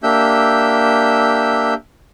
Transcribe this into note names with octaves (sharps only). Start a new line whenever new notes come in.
A#3 D4 G4 E5 E6 G6